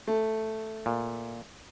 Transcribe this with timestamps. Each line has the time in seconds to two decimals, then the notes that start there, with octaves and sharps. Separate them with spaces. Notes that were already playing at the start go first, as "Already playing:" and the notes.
0.07 A3
0.86 A#2